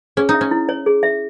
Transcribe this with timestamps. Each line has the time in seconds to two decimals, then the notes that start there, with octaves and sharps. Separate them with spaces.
0.17 C#4 G#4
0.29 D#4
0.34 E5
0.41 C#4
0.51 E4
0.69 C#5
0.86 G#4
1.03 E5